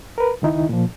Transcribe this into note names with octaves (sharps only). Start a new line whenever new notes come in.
A#4 B4
C#2 D#3 D#4 E4
A#2 F3